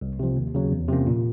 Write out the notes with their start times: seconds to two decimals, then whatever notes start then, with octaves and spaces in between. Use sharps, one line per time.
0.01 C2
0.19 C3 F3
0.36 D#2
0.55 C#3 F#3
0.72 E2
0.88 C3 F3 A#3 C#4
1.07 A#2